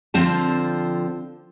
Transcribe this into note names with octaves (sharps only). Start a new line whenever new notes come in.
D3 F3 C4 F4 C5 A5